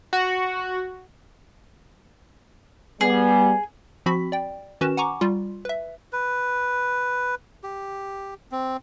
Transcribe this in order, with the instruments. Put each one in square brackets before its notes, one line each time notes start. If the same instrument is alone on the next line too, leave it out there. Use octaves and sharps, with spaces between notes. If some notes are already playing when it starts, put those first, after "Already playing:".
[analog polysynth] F#4
[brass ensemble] G3 B3 [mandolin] G#4
[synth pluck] F3 C4 F#4 B5 B6
D5 G5
D#3 C#4 F#4 B4 E7
F#5 G#5 A#5 C#6 D6
G3 F4
B4 E5
[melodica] B4
G4
C4